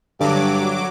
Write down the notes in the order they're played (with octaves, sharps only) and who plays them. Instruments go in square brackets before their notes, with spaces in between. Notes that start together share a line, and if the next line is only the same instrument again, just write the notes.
[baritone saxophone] G2 [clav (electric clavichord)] D3 [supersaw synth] F#3 D6